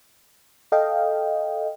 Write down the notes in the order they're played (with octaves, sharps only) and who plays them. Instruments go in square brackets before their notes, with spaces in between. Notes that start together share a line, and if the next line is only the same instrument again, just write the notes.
[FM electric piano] A4 D#5 F5 G5